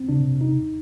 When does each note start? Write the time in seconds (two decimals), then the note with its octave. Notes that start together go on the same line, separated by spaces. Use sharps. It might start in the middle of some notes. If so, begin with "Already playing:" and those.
Already playing: C4
0.09 C#3 D4
0.20 C3
0.30 C3
0.41 D#4